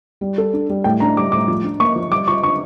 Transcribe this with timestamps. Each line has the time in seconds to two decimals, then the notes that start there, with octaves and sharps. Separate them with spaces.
0.21 G3
0.38 A4
0.53 D4
0.69 G3
0.84 A2 G5
1.00 D4 A#5
1.17 G3 D6
1.32 A2 D6
1.48 F3
1.64 D4
1.80 A#3 C#6
1.96 F3
2.11 G3 D6
2.28 F4 C#6
2.43 D4 C#6